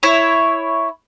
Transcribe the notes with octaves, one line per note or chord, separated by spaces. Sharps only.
E4 C#5